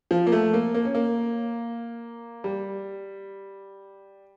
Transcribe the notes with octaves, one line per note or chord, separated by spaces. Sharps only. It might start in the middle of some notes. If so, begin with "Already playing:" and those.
F3
A#3
A3
A#3
A#3
C#4
A#3
G3